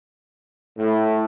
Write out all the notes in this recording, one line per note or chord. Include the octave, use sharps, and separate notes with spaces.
A2